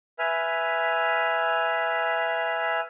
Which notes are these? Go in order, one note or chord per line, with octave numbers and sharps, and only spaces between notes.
B4 E5 G#5 F6